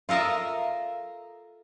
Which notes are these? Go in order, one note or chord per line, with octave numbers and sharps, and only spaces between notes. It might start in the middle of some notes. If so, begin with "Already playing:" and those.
F4 A4 A#4 D#5 E5